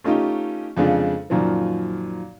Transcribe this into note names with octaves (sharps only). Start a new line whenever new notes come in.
A3 C#4 D#4 F4 G4
F2 C#3 G#3 D4 F4
F#2 A#2 D#3 F3